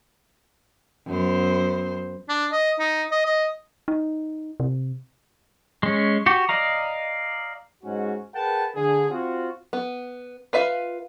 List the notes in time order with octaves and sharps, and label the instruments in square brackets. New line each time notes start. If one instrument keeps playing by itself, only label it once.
[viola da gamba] F#2 B3 C5
[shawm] D4
D#5
D#4
D#5
D#5
[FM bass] D#4
C3
[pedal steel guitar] G#3 C#4
F#4 G4
D5 D#5 F5 A#5
[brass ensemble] G#2 G#3 C#4 F#4
G#4 A#4 B4 F#5 G5 A5
D3 G#4
C4 F4 F#4
[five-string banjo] B3
F4 B4 E5 F5